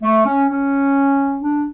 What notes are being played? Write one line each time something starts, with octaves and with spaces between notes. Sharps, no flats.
A3
C#4
C#4
D4